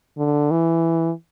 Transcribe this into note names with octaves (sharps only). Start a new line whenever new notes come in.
D3
E3